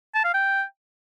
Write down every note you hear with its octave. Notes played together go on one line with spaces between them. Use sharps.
A5
F5
G5